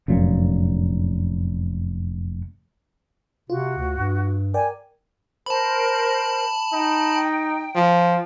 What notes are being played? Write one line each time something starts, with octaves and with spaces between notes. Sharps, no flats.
F1 F#2 A#2
C3 F4 F#4
D2
G2
A#4 D5 G5 G#5
A#4 C5 A5 B5
D#4 G5
F3